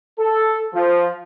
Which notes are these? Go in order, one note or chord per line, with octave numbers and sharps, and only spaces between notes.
A4
F3